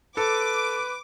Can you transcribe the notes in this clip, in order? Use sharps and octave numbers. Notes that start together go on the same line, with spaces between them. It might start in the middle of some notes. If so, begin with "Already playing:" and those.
A4 B4 D6